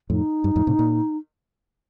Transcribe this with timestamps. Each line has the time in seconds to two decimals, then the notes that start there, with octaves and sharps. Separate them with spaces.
0.10 F2 A2 D#4
0.44 G2
0.56 F2 A2
0.67 A2 C3
0.79 A#2